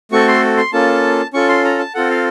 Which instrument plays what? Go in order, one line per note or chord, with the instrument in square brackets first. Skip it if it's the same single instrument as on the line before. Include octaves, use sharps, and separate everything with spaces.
[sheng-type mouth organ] A3 C4 F#4 A4 C#6
C6
C6
A#3 C#4 F4 A4 A5
C#4 F4 A4 C#6
C6
A#5
A5
C4 F4 A4 F#5
F5